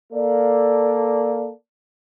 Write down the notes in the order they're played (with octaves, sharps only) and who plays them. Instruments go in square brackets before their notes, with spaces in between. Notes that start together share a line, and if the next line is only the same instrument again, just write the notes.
[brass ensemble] A#3 A4 D5